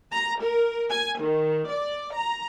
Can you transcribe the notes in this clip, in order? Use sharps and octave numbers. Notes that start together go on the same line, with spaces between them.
A#5
A#4
G#5
D#3
D5
A#5